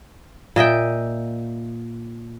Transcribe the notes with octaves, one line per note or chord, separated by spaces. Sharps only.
A#2 D#5 E5 G5